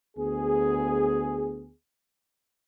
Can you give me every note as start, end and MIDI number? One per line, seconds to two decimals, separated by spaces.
0.17 1.71 38
0.17 1.71 59
0.17 1.71 68